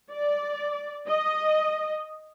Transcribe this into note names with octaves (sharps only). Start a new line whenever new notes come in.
D5
D#5